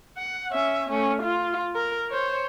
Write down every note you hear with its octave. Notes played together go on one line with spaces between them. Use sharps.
F#5
C#4 E5
A3 C#4
F4
A#4
C5 C#5